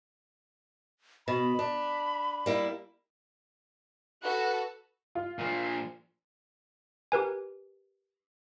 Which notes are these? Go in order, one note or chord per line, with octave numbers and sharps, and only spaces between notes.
B2 B5
D4
G3 A#3 E4
F#4 A4 B4 F#6
F4
A#2 F3
G4 A#4 B4 G#5